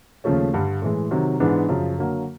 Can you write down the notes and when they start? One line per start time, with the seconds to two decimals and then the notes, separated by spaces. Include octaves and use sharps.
0.24 D#2 C#3 F3 A3 C#4
0.53 G2 D3 G3
0.82 A2 E3 G#3
1.11 C3 D#3 F#3
1.40 G#2 E3 G#3 B3 D4
1.69 F#2 C#3 F3
1.99 D3 F#3 A#3